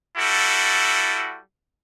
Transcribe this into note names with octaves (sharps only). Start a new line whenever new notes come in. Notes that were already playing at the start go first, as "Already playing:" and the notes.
G3 E4 F#4 A4